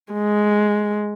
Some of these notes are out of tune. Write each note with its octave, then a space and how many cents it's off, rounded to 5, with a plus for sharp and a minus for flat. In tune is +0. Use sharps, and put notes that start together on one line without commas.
G#3 +5